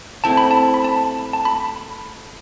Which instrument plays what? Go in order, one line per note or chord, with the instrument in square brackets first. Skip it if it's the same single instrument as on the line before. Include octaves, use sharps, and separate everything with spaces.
[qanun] A3 C4 E4 [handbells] A5
[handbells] B5
A5
B5
A5
A5
B5